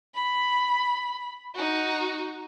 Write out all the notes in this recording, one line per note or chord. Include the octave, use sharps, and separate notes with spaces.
B5
D#4 F#4